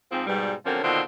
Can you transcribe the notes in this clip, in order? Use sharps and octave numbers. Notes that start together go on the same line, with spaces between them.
G#2 F3 C4
G#2 B2 G3
D3 F3 F#3 A#3 C4 C#4
B2 D3 D#3 C4 D4 F4